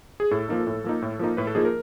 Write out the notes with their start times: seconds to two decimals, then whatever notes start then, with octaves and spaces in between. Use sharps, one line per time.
0.20 G#4
0.31 A2 A4
0.49 F3 A#3 D#4
0.67 A2
0.84 F3 A#3 D#4
1.02 A2
1.19 F3 A#3 D#4
1.37 A2 B4
1.47 A4
1.55 F3 A#3 D#4 G#4
1.65 A#4